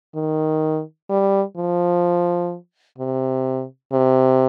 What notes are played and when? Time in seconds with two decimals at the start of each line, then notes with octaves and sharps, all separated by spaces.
0.16 D#3
1.10 G3
1.57 F3
2.98 C3
3.93 C3